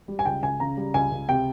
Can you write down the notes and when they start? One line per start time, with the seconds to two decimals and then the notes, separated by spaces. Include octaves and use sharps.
0.08 G3
0.19 G#5
0.25 C#2 G5
0.43 C#2 G#5
0.60 C#3 A#5
0.77 G3
0.94 C#2 G#5
1.12 C#2
1.29 C3 G5